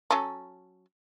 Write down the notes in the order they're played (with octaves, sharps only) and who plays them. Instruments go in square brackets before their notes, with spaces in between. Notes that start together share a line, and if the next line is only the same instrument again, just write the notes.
[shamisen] F#3 C#4 A4